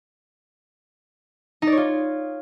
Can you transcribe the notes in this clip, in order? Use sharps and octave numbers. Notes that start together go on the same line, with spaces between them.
D#4
D5
C#5
F4